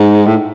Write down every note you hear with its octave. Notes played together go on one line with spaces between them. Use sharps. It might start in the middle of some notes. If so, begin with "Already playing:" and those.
Already playing: G#2
A2